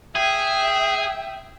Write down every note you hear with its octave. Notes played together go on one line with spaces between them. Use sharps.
G#4 E5 G5